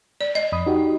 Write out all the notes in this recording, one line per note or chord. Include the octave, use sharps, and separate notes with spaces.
D5
D#5
F2 B5 D#6
D#4 F#4 G4